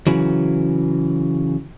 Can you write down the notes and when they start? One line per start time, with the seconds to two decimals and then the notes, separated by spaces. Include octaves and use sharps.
0.07 C#3 E3 F#3